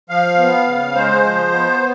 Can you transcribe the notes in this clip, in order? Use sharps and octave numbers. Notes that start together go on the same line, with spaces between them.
F3 F5
B3
C#3
G#3 C5
F3
B3